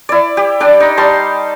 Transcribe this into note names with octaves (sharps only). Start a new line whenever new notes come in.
E4 D5
G4
D4 D5 G5
D#4
G3 A5 C6